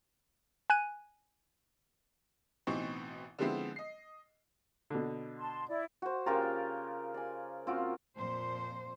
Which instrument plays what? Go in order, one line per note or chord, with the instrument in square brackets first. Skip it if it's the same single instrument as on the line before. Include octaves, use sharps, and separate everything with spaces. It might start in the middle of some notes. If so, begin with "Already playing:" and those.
[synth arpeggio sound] G#5 F#6 D#7
[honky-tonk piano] A1 B2 E3 C4 D#4 C#6
D3 F3 G#3 B3 C4 E4
D#5 C7
[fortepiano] B2 D3
[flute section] A5 C6
E4 D5
[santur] F#4 C5
[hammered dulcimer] C#3 F4 A#5 [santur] G4 A#4 D6
[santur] D5 G#5
[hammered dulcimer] C#3 C4 [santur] F4 F#4 D5
[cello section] F2 A#2 C5